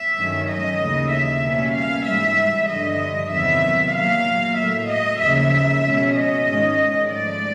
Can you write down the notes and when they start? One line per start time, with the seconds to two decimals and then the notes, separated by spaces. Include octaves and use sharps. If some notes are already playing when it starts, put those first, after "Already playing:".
Already playing: E5
0.17 G2 D#3 F#3 A3 C#4
0.48 D#5
0.80 D#2 C#3 E3 A3
1.11 E5
1.43 B2 G3 A#3 C#4
1.74 F5
2.06 G#2 E3 G3 E5
2.69 G2 D3 F3 D#5
3.32 E2 C3 D#3 F#3 B3 E5
3.95 A#2 F#3 A#3 F5
4.58 A2 F#3 A3 E5
4.90 D#5
5.21 D#2 C#3 F3 A#3 E5
5.84 B2 G#3 C#4
6.15 D#5
6.47 G#2 D#3 G#3 C#4
7.10 G#2 F3 A3 D5